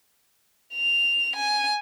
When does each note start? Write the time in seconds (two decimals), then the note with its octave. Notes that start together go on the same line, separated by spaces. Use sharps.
0.75 F7
1.36 G#5